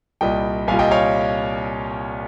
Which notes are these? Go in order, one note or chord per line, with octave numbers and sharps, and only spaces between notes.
C2 A#2 G3 D#5 G5
C2 A#2 G3 F5 G#5
D#5 G5
C#5 F5